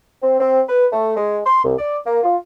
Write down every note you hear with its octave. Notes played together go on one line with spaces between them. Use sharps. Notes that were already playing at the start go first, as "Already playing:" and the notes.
C4
C4
B4
A3
G#3
C6
C2
D5
A#3
F4